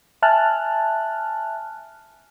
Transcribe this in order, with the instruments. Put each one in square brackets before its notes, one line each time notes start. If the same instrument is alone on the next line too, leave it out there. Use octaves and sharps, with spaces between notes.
[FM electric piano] E5 G#5 A5 F6 F#6